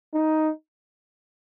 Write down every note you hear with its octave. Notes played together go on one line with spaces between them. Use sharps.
D#4